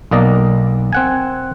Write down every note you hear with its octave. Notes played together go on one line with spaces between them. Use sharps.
B1 A#3 D5 D#5
C4 F#5 G#5